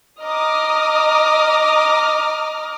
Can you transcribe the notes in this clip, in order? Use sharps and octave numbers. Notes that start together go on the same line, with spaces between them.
D#5 A#5 D6 D#6 F6